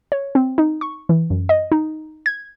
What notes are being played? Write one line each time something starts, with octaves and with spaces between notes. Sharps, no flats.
C#5
C4
D#4
C#6
E3
F#2
D#5
D#4
G#6